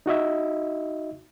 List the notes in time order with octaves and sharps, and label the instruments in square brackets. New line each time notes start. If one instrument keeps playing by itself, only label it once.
[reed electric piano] D#4 F#4 D#5 E5